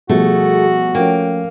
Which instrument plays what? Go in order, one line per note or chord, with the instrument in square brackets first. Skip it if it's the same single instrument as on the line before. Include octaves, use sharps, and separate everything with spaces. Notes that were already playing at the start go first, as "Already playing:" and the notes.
[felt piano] B2 F3 G3 [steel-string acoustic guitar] A3 [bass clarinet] F#4 [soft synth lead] G#4
[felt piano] F3 A3 C#4 [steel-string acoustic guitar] A#3 [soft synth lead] G5